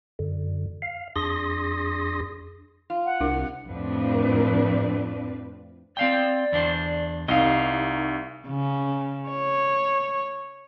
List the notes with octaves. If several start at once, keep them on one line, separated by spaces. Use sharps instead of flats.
F#2 D3
F5
F2 D4 G#4 C6 D#6 A#6
F4
F#5
C2 D4 E4 A#4
F2 A2 F3 C4 D4 B4
C4 D5 F5 G5
E2 D4 C5
C2 D#4 D#5 F5
C#3
C#5